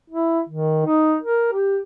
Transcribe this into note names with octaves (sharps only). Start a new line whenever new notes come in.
E4
D#3
D#4
A#4
G4